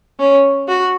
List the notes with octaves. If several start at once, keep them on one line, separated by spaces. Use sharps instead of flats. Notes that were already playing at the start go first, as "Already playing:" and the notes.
C#4
F#4